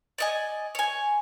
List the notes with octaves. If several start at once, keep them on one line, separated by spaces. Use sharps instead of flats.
D5 D#5 G#5
C#5 G#5